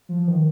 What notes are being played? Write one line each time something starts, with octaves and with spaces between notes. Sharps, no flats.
F3
D#3